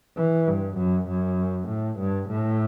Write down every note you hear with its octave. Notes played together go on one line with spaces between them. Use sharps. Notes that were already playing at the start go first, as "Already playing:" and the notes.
E3
G2
F#2
F#2
A2
G2
A2